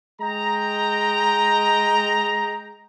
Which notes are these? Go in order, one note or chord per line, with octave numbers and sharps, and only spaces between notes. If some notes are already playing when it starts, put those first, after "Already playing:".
G#3 D#5 G5 A#5